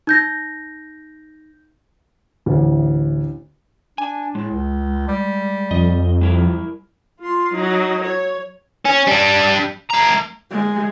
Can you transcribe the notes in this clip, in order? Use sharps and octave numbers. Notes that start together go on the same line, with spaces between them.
D#4 G6 A#6
A1 D2 E3
D4 G#5
A2 G#3
C#2
G3
F2 D#5
G3 E4 A#4
F4 C6
F#3 D#4
C#5
C#4
G3 D4
A3 A#5
G#3